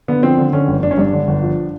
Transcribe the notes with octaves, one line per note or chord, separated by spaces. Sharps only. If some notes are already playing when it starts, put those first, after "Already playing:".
D3 B3
F3 C4
D3
D3 C#4
G1
G1 D4
C#4
G2 D4
D3
G1
F3